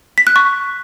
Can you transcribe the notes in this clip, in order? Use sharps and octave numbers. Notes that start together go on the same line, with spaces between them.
B6
F#6
C#6